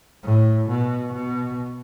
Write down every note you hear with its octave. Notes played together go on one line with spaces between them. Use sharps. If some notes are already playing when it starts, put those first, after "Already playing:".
A2
B2
B2